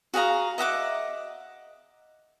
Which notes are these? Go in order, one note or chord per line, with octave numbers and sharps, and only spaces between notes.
F#4 G#4 F5 A#5
D#5 E5 F#5 D6